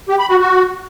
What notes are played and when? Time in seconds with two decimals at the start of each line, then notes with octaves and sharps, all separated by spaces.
0.09 G4
0.19 B5
0.29 F#4
0.40 F#4